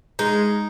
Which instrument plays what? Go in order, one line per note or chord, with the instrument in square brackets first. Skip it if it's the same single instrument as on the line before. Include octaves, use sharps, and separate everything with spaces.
[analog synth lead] G#3 [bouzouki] D#4